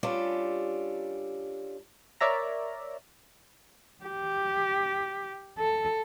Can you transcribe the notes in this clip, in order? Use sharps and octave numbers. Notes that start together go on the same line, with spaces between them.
G3 C#4 D4 F4 G4 A4
A#4 C#5 D5 E5 A#5
G4
A4